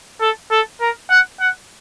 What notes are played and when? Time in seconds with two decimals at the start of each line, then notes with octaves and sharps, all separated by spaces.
0.21 A4
0.51 A4
0.81 A#4
1.10 F#5
1.40 F#5